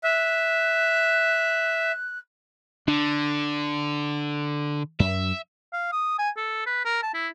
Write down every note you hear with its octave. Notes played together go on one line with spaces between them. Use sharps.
E5 F#6
D3 D4
F#2 E5
F5
D#6
G#5
A4
B4
A#4
A5
E4